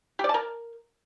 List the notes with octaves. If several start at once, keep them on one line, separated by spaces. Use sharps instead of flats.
G4
D5
A5
A#4